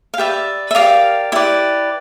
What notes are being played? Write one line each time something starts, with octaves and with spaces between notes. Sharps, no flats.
F5
G4 B4 D5 E5
E5
G4 A#4 D5 D#5 F5
E4 G4 B4 D5 E5